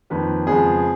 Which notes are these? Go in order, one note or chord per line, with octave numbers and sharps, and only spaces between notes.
F2 D#3 A#3 B4
F2 C#3 G#3 B3 G#4